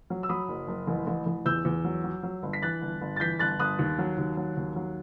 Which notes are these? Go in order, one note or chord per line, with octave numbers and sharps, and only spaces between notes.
F#3
E6
F#3 B5 D#6
F#1
F#1
A1
A1
A1
E2 E6 G6
E2
F#3
F#3
F#3
G1
B6
E3 F#6 A6
G1
G1
A6
E3 G6 B6
G1 F#6 A6
G1 D#6 F#6
D#2
F#3
D#2
F#3
D#2
F#3